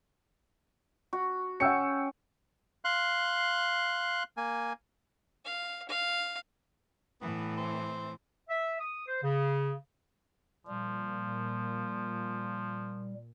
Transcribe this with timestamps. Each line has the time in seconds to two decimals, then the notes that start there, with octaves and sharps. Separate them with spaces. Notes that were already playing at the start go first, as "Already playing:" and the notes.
1.13 F#4
1.60 C#4 F#5 G5 E6 C#7
2.85 F5 C6 F#6
4.37 A#3 G#5
5.45 F5
5.88 F5
7.21 A2 E3 B3
7.57 C4
8.49 E5
8.79 D#6
9.07 C5
9.22 C#3
10.67 A#2 F3 G3